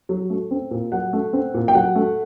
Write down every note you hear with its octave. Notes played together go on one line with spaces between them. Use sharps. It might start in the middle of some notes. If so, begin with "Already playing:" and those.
F#3
A3
C4
A#2
F#3 F#5
A3
C4
A#2
G5
F#3 F#5
A3